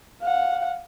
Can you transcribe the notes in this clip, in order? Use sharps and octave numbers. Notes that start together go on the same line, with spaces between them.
F5 F#5